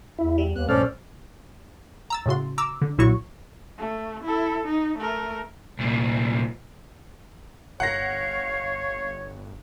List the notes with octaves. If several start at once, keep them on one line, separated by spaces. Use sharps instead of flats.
E2 E4
G3
D#2 B3 F#6
A#1 G2 A3 C#4 A4 C5 D5 F6
A#5 E6 A6
A2 C#3 F#4 C6
A#5 D6 E6
D3
B1 A#2 E4 F#4 C#5 C#6
A3
E4 A4
D#4
A3 A#4
C2 A#2
G1 C#5 F5 F#5 A#6